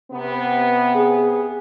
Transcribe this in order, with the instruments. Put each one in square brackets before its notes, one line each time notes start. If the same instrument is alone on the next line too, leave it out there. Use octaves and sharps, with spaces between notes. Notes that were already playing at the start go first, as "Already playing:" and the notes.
[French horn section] C3 B3
[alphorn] G#4